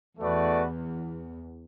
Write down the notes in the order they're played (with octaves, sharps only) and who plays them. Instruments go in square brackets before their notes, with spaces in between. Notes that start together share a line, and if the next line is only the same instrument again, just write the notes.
[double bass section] E2 [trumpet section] A3 F#4 B4 D5